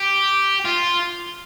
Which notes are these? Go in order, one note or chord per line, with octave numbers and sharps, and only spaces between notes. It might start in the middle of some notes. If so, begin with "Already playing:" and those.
Already playing: G4
F4